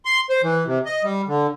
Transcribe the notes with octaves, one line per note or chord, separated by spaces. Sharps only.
C6
C5
E3
C3
D#5
G3
D3